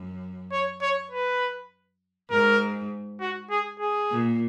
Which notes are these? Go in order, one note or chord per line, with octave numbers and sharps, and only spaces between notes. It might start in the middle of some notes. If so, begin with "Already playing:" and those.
Already playing: F#2
C#5
C#5
B4
G#2 A#4
F#4
G#4
G#4
A#2